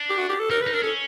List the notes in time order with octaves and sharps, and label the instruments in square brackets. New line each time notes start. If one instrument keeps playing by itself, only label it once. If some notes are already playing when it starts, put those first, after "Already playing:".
Already playing: [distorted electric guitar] D4
[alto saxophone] G4
F#4
G4
A4
[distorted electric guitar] D#4 [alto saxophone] A#4
[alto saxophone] B4
[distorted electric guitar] D#4
[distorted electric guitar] D4 [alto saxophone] A#4
[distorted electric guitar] C#4 [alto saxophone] A4